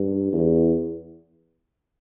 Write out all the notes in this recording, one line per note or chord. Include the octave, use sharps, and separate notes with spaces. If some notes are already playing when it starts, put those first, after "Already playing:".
Already playing: G2
E2